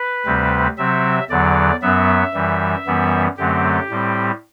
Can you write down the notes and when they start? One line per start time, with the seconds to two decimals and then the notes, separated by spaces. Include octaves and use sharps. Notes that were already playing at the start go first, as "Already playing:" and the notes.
Already playing: B4
0.26 D2 C3 G3 C4
0.77 C3 F#3 C4 E5
1.30 E2 D3 F#3 D5
1.82 F#2 F#3 B3 E5
2.34 F#2 E3 G3
2.86 F#2 E3 G3 B3
3.37 F#2 D3 F#3 A3 C4 G4
3.90 A2 G3 C4